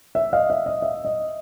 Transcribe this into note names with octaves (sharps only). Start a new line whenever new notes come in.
E5
D#5 F5
E5
D#5
E5
D#5